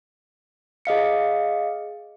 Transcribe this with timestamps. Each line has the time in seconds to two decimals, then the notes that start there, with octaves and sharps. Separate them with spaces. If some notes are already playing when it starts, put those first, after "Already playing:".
0.85 G#4 D#5 F5 C#7